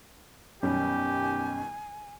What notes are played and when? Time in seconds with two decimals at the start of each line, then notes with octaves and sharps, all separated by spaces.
0.63 F#2 B2 D#3 G3 C#4 G4 G#5